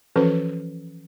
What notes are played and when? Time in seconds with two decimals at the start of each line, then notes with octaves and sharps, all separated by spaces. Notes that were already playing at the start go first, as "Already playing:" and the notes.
0.16 E3 F3 C#4 F#4 A4 B4